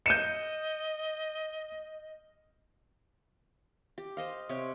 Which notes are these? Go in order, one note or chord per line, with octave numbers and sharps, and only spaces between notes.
D#5 G6 C#7 D#7 E7
G4
C5 D#5 F5
C3 G4 C#5